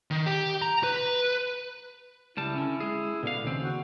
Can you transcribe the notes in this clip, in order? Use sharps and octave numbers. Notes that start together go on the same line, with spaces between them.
D#3
G4
A#5
B4
C#2 G3 E4 A5
D3 C#4
G#3 G#4
B2 D3 F5
D#2 C#3 C4
F#4